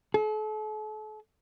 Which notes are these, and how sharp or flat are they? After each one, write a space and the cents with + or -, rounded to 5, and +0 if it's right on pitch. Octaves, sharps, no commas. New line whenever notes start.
A4 -40